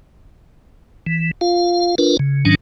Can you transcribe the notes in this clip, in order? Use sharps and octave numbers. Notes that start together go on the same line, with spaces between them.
E3
F4 F5
D4 F4 A#4 B4
C#3
G#2 D#3 F#3 C#4 D4